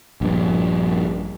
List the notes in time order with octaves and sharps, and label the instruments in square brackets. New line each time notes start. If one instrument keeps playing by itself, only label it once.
[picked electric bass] A#1 G2